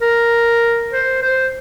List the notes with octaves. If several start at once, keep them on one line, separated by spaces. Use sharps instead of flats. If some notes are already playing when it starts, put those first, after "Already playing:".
A#4
C5
C5